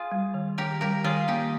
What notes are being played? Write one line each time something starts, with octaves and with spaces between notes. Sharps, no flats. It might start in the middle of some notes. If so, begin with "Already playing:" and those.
Already playing: F4 G#4
G3
D#3
D#3 G4 A#4
G3 G4 A#4
D#3 F4 G#4
A#3 D#4 G4